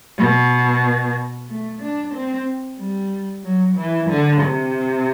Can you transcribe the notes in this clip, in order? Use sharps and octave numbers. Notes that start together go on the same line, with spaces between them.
B2
A3
D4
C4
G3
F#3
E3
D3
C3